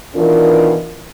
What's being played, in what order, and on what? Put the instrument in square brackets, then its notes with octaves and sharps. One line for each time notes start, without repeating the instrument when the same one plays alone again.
[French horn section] B2 D#3 E3 D4 F4 A#4